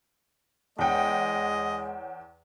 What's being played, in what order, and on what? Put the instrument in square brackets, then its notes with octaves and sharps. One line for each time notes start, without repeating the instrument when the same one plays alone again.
[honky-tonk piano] E2 G5 [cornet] G#3 [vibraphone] C#5 F#5 [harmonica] D#5